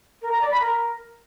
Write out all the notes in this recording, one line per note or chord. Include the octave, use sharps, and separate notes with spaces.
A#4
A#5
D5
B5
A#4